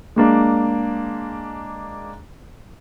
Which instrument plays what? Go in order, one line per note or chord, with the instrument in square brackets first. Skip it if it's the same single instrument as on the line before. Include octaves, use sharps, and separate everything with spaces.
[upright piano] G#3 A#3 D4